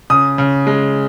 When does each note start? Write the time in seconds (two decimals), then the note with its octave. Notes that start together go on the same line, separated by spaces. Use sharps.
0.10 C#3 D#6
0.38 C#3
0.67 G#3